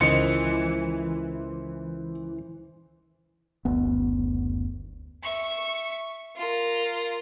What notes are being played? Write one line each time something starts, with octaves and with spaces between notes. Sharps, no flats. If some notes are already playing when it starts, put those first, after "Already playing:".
C#2 D#3 E3 C5 D#5 C#7
F#1 D2 B3
E5 C#6
F4 A#4